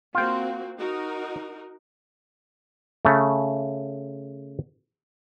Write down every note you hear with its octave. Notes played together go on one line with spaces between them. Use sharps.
A#3 C4 F4 F#4 G5
D#4 F#4 A#4
C#3 A3